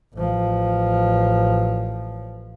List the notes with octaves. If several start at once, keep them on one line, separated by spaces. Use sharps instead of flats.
A1 F3